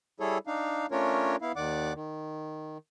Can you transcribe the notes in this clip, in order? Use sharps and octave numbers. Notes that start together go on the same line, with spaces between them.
G3 E4 G#4 A4 C#5
D4 D#4 F5
A3 C#4 D4 F4 A#4 C#5
B3 E4 F5
D#2 D#3 D5 F#5 D6
D#3